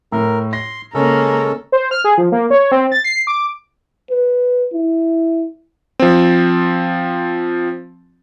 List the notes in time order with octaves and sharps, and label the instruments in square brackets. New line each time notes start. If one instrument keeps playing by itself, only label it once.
[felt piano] A2 [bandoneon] A#4
[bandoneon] C6 [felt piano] A#6
[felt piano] C#3 [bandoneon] G#3 C#4 A4 [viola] A#3 A#4
[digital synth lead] C5
F6
G#4
F3
A#3
C#5
C4
A6
C7
D6
[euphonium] B4
E4
[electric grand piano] F3 C4